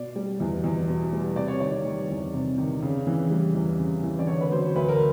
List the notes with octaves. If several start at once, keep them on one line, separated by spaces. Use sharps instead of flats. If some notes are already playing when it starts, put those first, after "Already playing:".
Already playing: B2 D5
G3
E2
E2
B2
G3
C3 D5
C#5
D#3 D5
G3
E2
C3
D#3
C#3
E3
G3
E2
C#3
E3
D5
D3 C#5
B4
F#3 C5
D2 B4
A#4